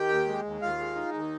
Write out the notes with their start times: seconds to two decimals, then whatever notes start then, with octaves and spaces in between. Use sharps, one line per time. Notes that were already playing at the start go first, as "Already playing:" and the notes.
Already playing: D#3 G4 G5
0.09 D#2
0.27 G#3
0.44 D#2
0.62 D#2 F4 F5
0.79 G#3
0.95 D#4
1.13 D#2